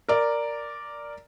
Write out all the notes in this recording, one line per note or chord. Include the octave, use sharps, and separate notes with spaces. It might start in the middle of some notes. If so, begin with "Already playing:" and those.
A#4 D5